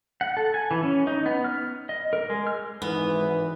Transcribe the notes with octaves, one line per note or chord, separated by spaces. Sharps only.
F#5
A4
G#5
E3
C#4
D#4
B3
F6
D#5
A#4
G#3
F6
G#1 G#2 E3 B3 B4